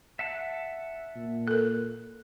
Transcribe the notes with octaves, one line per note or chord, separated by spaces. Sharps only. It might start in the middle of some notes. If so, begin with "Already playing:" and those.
E5 F#5 A5
A#2
A4 A#4 F#6